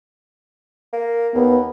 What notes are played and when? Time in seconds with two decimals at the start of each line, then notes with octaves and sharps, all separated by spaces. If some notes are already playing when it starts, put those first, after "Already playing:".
0.93 A#3
1.34 D#2 B3